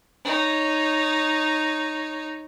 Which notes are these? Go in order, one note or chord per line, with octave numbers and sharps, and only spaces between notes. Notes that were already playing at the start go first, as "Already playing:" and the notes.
D#4 C#5